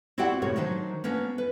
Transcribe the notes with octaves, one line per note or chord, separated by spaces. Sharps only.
C4 E4 F#4 G4 D5 F#5
A2 C3 A#4 C#5
D#3 F#3 D4 D#4 C5
A#3 B3 C#4 D4
B4